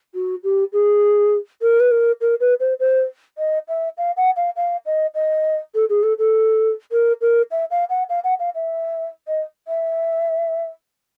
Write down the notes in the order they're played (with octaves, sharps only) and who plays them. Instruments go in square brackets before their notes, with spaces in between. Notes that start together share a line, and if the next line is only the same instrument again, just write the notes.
[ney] F#4
G4
G#4
A#4
B4
A#4
A#4
B4
C5
C5
D#5
E5
F5
F#5
F5
F5
D#5
D#5
A4
G#4
A4
A4
A#4
A#4
E5
F5
F#5
F5
F#5
F5
E5
D#5
E5